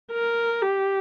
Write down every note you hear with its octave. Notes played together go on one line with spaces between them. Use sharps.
A#4
G4